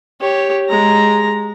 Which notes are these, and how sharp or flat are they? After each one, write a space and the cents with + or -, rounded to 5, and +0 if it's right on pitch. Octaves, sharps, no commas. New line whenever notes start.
G4 +0 C#5 +0
G#3 +0 A#5 +0